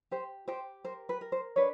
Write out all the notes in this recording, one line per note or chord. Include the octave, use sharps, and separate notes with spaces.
G4 C5
G4 C5
A#4 C5
B4
A#4
C5
D4 B4 C#5